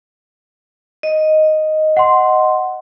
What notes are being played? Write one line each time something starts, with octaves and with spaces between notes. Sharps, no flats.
D#5
F#5 C6